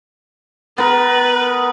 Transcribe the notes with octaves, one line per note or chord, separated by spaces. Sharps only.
B3 A#4 B4